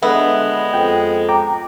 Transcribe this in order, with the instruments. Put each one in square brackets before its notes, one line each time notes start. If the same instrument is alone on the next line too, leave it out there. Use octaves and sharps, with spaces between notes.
[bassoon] D3 [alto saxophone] G#3 [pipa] B3 [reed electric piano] E5
[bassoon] F2 [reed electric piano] G5
[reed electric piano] G5 A#5 D6